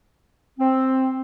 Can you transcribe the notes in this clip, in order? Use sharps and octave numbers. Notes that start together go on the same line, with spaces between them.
C4